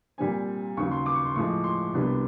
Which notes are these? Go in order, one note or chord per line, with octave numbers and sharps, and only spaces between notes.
A#2 G3 C4 G#5
D#2 C#3 F#3 C#6
C6
D6
C#6
C6
A2 F3 G#3 C#6
C6
C2 B2 G3 B3 D4